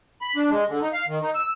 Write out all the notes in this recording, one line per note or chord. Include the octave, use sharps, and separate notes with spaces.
B5
D4
G#3
D3
D#4
F5
D#3
D#4
E6